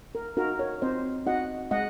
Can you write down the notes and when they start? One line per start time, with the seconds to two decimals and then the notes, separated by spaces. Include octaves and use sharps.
0.15 A#4
0.37 D#4 F#4 A#4
0.59 A#4 C#5
0.82 C4 C5 D#5
1.26 D#4 F#4 D#5 F#5
1.71 G#3 D#5 F#5